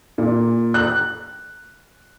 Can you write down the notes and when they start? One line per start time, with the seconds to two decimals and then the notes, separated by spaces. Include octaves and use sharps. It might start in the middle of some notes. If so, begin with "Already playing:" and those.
0.18 A#2
0.74 F#6